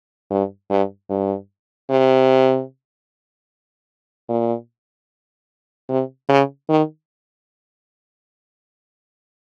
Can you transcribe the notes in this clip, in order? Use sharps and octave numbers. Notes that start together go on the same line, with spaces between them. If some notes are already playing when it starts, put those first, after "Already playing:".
G2
G2
G2
C3
A#2
C3
C#3
D#3